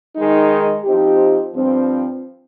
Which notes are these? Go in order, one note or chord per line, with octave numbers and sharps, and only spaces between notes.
D#3 G#3 D#4
F3 C4 D#4 G4
G2 F3 C4